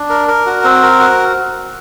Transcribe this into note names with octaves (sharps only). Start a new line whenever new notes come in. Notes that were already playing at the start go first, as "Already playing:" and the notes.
Already playing: D4
A#4
A#4
F#4
C4
A#4
F#4